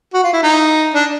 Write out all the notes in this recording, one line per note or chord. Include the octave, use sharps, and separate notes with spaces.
F#4
F4
E4
D#4
D4